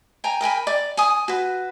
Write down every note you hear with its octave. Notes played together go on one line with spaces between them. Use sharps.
G5 G#5 A#5
A#4 G5 G#5 B5
D5 D6
G#5 D#6
F#4 B4